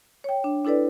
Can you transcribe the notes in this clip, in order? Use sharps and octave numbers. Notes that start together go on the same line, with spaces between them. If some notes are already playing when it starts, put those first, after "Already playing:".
C#5 G5
D4
D4 E4 A4 B4 D5